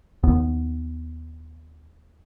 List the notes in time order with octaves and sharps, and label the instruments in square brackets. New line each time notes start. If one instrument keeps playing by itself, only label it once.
[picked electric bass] D#2 B3